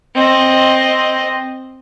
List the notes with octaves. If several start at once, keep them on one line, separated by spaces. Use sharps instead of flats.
C4 D#5